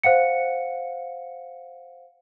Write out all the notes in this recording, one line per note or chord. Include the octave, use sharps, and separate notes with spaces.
C5 F5 F#5 C#7